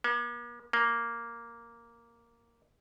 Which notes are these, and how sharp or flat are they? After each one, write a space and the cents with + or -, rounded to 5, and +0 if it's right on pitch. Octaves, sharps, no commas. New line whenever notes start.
A#3 +45
A#3 +0